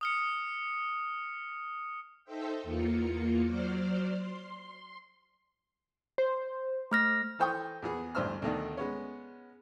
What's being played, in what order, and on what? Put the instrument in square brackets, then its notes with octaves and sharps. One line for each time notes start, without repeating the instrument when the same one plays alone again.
[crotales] D#6 F6 C#7
[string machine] D#4 A4 C5 E5 G5
E2 A#3 F4 C#7
F#3 C5 D5 F6
C6
[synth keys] C5
[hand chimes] A3 F6 A#6
[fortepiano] E3 A4 C5 G5 C#6 D#6
E2 B3 G#4
A1 D2 G2 C5 E6 F6
D2 B2 D3 D#3
G#3 B3 C#4